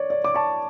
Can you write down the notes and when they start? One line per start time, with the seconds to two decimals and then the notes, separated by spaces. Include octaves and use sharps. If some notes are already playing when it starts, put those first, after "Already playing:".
Already playing: C#5 D5
0.10 D5
0.24 D6
0.34 A5 C#6